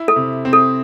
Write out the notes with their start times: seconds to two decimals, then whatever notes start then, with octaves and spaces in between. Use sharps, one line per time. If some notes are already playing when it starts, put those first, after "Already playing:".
Already playing: E4
0.08 A4
0.16 C3
0.45 C4
0.53 A4